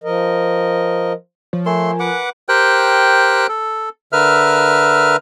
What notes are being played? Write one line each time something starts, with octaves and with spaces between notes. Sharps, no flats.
F3 A#4 D#5
F3 C#5
A3 A#4 G#5 C6
B4 F#5 D6
G4 A#4 C5 G5 F#6
A4
D3 A#4 B4 E5 F6